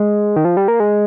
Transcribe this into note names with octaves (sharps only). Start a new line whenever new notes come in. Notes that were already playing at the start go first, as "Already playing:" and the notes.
Already playing: G#3
D#3
F3
G3
A#3
G#3